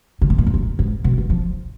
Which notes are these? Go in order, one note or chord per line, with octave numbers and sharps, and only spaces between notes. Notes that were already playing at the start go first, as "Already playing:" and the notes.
C#3
B2
A#2
G#2
F#2
G#2
B2
F#3
F3